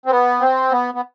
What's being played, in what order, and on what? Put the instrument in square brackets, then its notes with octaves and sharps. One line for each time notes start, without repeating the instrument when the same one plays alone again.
[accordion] C4
B3
C4
B3
B3